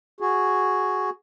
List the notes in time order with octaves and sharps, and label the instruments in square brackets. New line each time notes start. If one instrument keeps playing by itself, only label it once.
[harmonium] F#4 G#4